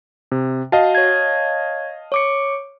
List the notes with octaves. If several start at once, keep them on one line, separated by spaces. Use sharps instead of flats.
C3
F#4 D#5 F5 A5
C#5 G#6
C#5 D6 C#7